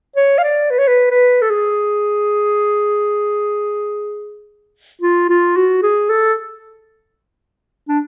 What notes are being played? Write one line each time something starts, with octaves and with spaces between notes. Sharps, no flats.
C#5
F5
D5
B4
C#5
B4
B4
A4
G#4
F4
F4
F#4
G#4
A4
D4